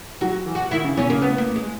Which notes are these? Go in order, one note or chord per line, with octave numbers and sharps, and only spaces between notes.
F#3 F#4
E3
F#4
D#3 E4
C#3
B2 C#4
C#3 A#3
B3
A#3
G#3